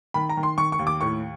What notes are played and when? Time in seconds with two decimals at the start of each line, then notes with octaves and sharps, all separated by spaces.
0.14 D#3 B5
0.29 A#5
0.37 D#3
0.43 C6
0.58 D#3 C#6
0.72 C#6
0.79 D#2
0.87 D6
1.01 A2 C#6